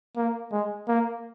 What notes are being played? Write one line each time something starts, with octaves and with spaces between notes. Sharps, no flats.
A#3
G#3
A#3